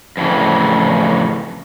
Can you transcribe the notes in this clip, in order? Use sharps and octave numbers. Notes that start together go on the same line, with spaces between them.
F2 A2 C#3 E3